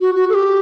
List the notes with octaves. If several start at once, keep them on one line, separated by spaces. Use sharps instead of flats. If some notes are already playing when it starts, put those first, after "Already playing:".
F#4
F#4
A4
G4